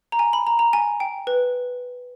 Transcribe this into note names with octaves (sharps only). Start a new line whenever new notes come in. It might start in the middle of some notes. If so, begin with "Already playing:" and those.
A#5
G#5
B5
A#5
A#5
G#5
G5
B4